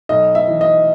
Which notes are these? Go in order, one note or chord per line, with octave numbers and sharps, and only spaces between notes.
B1 D#5
E5
E3
D#5